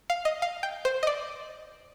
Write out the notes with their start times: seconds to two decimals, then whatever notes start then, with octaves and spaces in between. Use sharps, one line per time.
0.10 F5
0.25 D#5
0.42 F5
0.63 G5
0.85 C5
1.03 D#5
1.07 D5